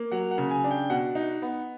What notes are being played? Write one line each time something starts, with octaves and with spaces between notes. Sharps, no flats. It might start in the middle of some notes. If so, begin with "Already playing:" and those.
Already playing: A#3
F#3 F#5
F#5
C#3
G#5
D4
G5
B2 F#5
D#4
B3